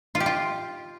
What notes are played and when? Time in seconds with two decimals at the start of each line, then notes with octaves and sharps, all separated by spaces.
0.15 F4
0.20 G4
0.26 F4